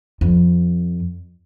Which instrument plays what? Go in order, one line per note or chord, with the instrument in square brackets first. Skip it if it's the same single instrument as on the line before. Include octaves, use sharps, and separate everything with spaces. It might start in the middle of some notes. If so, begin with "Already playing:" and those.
[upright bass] F2